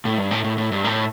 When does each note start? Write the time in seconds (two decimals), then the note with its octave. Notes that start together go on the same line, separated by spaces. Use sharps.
0.05 A2
0.18 G2
0.31 A2
0.44 A2
0.58 A2
0.72 G2
0.84 A2